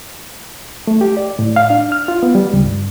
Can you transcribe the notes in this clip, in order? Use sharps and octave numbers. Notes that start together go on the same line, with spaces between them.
A3
G4
D5
A2
F5
D4
F6
F4
B3
G3
C#2
G2